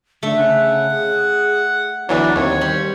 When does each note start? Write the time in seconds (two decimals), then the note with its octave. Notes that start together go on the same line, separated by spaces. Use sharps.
0.23 D3 A3 E5
0.37 C#3 F#5
0.91 G#4
2.09 D2 E3 F#3 B3 D4
2.36 D#2 C4 C#5
2.61 G3